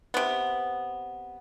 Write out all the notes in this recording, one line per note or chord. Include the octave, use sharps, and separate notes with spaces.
C3 B3